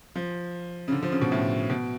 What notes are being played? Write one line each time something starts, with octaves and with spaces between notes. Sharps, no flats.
F3
C#3
D3
F3
C#3
B2
A2
B2